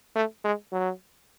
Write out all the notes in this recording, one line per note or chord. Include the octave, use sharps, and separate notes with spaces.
A3
G#3
F#3